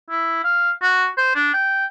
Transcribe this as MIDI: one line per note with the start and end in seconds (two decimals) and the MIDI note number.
0.10 0.39 64
0.44 0.71 77
0.82 1.07 66
1.17 1.35 72
1.35 1.52 62
1.54 1.85 79